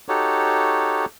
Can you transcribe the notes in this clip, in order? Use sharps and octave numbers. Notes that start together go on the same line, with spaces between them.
D#4 F#4 G4 A4 C#5